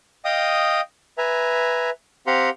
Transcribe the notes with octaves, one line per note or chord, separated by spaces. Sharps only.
D#5 F5 G5 D#6
B4 E5 G#5 A#5
C4 G4 F5 F#5 A#5 C6